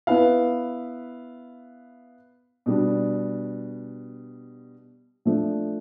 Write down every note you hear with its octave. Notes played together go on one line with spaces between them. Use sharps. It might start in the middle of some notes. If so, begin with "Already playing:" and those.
B3 E4 B4 F5
B2 G3 D4
F3 A3 D4